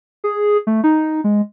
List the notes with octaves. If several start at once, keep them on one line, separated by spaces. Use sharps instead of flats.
G#4
A3
D#4
G#3